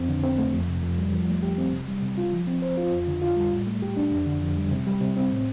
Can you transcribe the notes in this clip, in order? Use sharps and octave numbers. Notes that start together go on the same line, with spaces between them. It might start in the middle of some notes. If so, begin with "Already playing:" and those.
Already playing: F2 C4
D3
C4
A3
F2
C3
F2
G3
F3
A3
G4
C4
C3
G3
C3
F4
F3
C4
C5
F4
F2
D3
F4
G3
A2
A3
G4
D4
F2
D3
F2
G3
C3
G3
C3
C4
A2